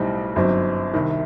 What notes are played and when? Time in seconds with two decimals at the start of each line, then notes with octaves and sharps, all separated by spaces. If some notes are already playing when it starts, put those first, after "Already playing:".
Already playing: B1 A2 G3 C4 D#4
0.36 G1 F#2 F#3 C4 D#4
0.94 C2 C3 D#3